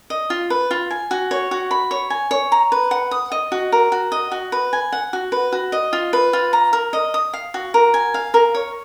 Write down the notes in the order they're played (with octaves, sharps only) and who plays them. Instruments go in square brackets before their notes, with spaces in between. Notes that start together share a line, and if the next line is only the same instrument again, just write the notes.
[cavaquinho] D#5
F4
B4
F4
G#5
F#4
C#5
F#4
B5
C#5
G#5
C#5
A#5
B4
F#5
D#6
D#5
F#4
A#4
F#4
D#5
F#4
B4
G#5
F#5
F#4
B4
F#4
D#5
F4
B4
F4
A#5
A#4
D#5
D#6
F5
F#4
A#4
G#5
F5
A#4
C#5